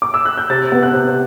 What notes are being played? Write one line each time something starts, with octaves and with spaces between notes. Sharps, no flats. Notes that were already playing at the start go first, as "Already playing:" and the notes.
D6
E6
F#6
G6
C3 A6
B3
F#6
C3